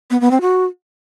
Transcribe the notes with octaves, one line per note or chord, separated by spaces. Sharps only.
B3
B3
C4
F#4